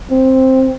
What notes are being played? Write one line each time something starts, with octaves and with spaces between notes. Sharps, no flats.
C4